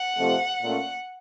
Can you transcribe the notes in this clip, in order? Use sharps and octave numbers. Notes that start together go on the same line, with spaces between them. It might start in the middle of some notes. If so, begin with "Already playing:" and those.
Already playing: F#5
F2 C3 F3 A3
A#2 A3 C#4